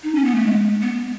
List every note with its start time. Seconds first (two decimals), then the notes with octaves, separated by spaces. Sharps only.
0.03 D#4
0.15 C#4
0.25 B3
0.36 A3
0.46 G#3
0.82 B3